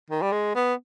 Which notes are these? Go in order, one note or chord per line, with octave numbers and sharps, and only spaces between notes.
D#3
G3
G#3
B3